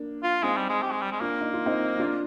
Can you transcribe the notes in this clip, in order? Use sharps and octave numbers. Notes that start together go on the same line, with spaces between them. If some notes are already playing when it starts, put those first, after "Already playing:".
Already playing: A#3 D4
F4
G#3 C4 D#4
G3
G#3
G4
G#3
G3
G#3
A#3 D4 F4
D#4
F4
C4 D#4
D4 F4